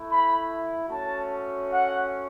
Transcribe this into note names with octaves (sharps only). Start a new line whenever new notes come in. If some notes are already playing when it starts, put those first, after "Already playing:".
Already playing: A3 E4
B5
A3 C#4 F#4 A5
F#5